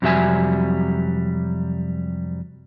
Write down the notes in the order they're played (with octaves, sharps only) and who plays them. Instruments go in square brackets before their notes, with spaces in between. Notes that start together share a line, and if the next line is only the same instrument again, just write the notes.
[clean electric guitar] F2 C3 F#3 G3 E5 G#5